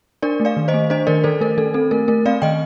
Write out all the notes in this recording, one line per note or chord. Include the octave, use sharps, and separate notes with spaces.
D4 A#4 D5
A3
D5 F5
D#3
C5 D#5
A3
D4 C5 D#5
D#3 A#4 D5
D#3 A4 C5
A3 A#4
D#3 A4
C4 A4
A3 A#4
A3 A#4
C4 D5 F5
D#3 D#5 G5